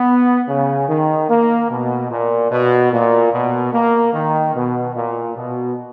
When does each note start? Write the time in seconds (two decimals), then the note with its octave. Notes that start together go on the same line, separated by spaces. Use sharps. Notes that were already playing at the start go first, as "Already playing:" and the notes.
Already playing: B3
0.49 C#3
0.89 D#3
1.29 A#3
1.70 B2
2.11 A#2
2.51 B2
2.92 A#2
3.33 B2
3.73 A#3
4.14 D#3
4.55 B2
4.95 A#2
5.35 B2